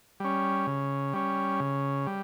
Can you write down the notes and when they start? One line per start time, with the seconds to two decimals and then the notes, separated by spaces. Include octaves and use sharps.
0.20 G3 C#4
0.67 C#3
1.14 G3 C#4
1.60 C#3
2.07 G3